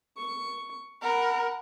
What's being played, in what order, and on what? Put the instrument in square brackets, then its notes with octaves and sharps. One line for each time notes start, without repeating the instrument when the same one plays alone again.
[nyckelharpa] C#6
[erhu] A#4 [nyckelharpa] F#5 B5